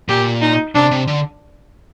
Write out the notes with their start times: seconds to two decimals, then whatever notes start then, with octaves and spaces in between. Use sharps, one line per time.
0.08 A#2 G4
0.42 D#4
0.75 C3 D4
0.91 C3
1.08 D3